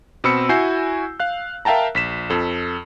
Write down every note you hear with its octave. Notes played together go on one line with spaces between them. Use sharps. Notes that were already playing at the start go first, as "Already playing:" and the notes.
B2 C4 B5 E6 C#7
E4 F#4 G#5 G6 C7
F5 F#6
A#4 E5 F5 G5 A5 A#5
A#1 B6 E7
F2 A4